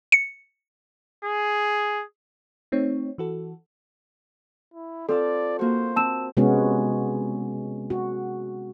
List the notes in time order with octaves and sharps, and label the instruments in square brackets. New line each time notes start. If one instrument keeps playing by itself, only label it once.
[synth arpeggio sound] C#7
[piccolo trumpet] G#4
[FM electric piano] A3 C4 D#4 C#5
E3 F#4 A4
[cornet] E4
[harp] C4 F4 A5 [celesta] A4 [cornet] D5
[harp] A#3 F#4 [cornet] C5
[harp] C4 [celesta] A5 E6 E7
[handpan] C3 G#3 B3 C#4 F#4
F#4